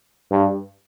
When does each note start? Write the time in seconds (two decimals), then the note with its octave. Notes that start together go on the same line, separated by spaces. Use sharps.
0.31 G2